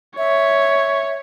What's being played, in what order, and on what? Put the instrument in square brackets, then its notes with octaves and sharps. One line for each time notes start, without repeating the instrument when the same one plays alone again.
[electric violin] C#5 [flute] E5